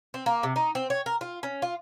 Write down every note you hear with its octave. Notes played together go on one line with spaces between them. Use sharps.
C4
A#3
C3
D#4
C4
C#5
A#4
F4
C#4
F4